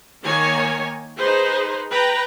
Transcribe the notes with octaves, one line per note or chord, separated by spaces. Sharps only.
D#3 A#3 C#5 G#5
D#4 G#4 B4 C5
B4 G5 A#5